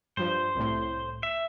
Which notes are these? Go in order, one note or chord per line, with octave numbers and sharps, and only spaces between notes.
G2 F3 C5
C2 A2
E5